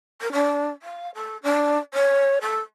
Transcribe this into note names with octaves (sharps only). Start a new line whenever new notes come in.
A#4
D4
F5
A4
D4
C#5
A4